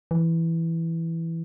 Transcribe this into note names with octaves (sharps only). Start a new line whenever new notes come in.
E3